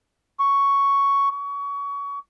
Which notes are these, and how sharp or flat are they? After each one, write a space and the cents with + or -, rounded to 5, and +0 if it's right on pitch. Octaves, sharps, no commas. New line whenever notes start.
C#6 +5
C#6 +25